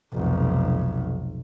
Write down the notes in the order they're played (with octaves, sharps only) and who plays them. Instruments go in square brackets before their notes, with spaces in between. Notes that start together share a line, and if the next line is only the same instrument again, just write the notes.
[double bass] F1 B1